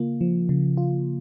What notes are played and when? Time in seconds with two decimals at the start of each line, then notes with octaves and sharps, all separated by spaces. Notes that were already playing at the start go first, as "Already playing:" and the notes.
Already playing: C#3 A#3 F4
0.21 F3
0.49 C#3
0.78 F4